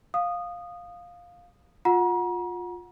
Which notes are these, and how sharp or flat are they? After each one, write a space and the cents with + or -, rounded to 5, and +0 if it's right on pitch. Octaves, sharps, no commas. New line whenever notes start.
F5 +10 D#6 -15
F4 +25 F#5 -15 A#5 +40